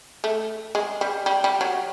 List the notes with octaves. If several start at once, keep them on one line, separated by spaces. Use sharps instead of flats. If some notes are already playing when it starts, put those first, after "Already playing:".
A3
G#3
G3
G3
G3
F#3